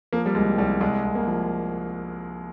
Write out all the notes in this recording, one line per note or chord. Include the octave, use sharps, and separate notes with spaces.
F3 A#3
G3
C2 G#3
C2 G3
C2 G#3
C2
A#3
F3